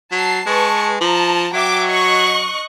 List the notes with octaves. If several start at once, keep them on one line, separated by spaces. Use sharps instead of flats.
F#3 A5 C7
G#3 B4 A5 C#6
F3 A5 A#5
F#3 E5 G5 D6
D#5 C#6 F#6